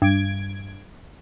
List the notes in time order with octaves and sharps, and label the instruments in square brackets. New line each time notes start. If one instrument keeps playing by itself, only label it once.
[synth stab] G2 G#6 D7